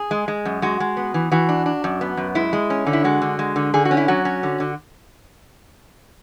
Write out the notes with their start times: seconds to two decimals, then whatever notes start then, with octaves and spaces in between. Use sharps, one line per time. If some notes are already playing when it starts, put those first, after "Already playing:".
Already playing: G#4
0.11 G#3
0.28 G#3
0.45 F#2
0.62 G#3 F#4
0.80 G#3
0.97 B3
1.14 E3
1.32 E3 F#4
1.49 D4
1.66 D4
1.84 F#2
2.01 B3
2.17 F#2
2.35 G#3 E4
2.53 G#3
2.70 C#4
2.87 D3
2.93 E4
3.04 G#3 F#4
3.22 D3
3.39 G#3
3.56 D3
3.74 D3 G#4
3.85 F#4
3.91 C#4
3.97 E4
4.08 F#3 F#4
4.25 C#4
4.43 D3
4.60 D3